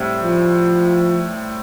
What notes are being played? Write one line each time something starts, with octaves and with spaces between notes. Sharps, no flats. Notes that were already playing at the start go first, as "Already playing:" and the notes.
Already playing: A2 G3 C4
F3